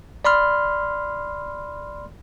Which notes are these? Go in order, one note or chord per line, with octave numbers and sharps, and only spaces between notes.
D5 B5 C6 F6